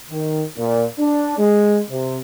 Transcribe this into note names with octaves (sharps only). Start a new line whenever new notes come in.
D#3
A#2
D4
G#3
C3